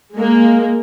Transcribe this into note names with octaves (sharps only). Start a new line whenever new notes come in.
G#3 A#3